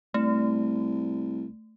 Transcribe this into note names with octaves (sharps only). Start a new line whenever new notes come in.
C2 A3